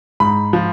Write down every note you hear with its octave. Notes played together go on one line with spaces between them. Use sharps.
G#2 B5
F3